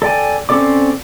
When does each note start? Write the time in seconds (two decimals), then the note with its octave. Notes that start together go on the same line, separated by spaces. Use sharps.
0.02 A4 D5 G5 G#5
0.49 C4 C#4 A4 D5 D6